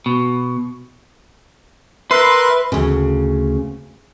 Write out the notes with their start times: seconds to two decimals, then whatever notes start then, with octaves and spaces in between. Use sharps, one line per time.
0.06 B2
2.11 A#4 B4 E5 C6 F#6
2.72 D2 C#3